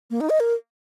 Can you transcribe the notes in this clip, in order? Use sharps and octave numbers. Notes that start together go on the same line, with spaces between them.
A#3
D#4
D#5
A#4